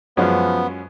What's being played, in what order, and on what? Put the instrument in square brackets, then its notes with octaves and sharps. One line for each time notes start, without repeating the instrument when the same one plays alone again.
[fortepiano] F#2 G#3 C#4 [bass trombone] F3 [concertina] B3